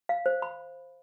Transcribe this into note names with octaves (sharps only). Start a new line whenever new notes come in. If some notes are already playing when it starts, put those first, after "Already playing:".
F5
C5
B5